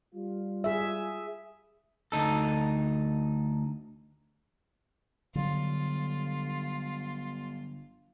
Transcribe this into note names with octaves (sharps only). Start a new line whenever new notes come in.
G3 F4
G#4 E5
D2 D#4 A4
G1 D3 F#3 F4